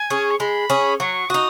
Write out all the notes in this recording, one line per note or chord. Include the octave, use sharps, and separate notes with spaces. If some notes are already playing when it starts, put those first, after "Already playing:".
Already playing: G#5
C#4 G#4
C#6
G#3 B5
C#4 G#4
F#3 C#6
D#4 F#4 D#6